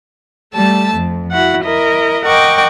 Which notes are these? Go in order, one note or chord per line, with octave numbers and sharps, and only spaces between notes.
G3 A3 A5 E6
F2
E4 F#4 F#5
E4 A#4 D#5
A#4 D#5 F#5 G5 C#6 D6